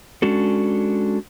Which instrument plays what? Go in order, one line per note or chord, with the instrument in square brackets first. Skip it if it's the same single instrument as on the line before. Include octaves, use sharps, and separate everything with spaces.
[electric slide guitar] G#3 C#4 D4 F#4 A4